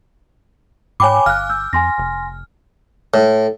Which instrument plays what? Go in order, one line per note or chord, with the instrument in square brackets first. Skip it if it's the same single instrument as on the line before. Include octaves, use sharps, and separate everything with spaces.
[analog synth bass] G#2 [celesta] C#5 G5 B5 [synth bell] G#5 D6
[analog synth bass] G1 [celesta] F5 F#6 [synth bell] F6
[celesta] E6 G6
[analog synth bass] F2 [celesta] G#5 C6 A#6
[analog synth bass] F1
[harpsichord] A2